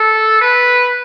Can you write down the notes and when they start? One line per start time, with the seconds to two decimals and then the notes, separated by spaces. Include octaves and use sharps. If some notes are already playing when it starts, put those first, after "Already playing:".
Already playing: A4
0.41 B4